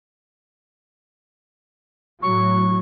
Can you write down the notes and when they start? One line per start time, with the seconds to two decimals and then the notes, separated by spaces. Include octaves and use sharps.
2.23 A2 F#3 C#6